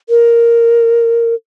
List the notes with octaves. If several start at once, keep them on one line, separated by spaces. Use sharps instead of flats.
A#4